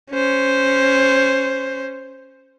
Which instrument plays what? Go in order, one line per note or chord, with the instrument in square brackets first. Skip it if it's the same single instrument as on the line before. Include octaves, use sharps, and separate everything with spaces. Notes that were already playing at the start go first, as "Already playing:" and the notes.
[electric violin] C#4 C5